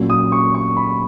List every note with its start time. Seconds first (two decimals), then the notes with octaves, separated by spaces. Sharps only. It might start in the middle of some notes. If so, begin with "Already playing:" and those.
Already playing: A#2 F#3 C#4
0.10 D#6
0.32 C#6
0.54 C#6
0.77 B5